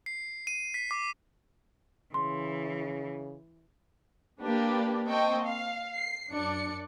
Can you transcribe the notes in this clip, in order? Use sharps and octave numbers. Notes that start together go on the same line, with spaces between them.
C7
D#7
B6
D6
C#3 E3 C6
A#3 D4 G4 B4
A#3 C4 D#5 G5 A5 C#6
F5
C7
F#2 D4 D5 C#7